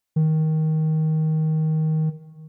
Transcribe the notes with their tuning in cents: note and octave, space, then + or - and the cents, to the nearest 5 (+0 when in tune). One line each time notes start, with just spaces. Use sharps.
D#3 +15